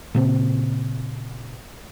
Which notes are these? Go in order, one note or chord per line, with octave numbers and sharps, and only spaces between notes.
A#2 C#3 C4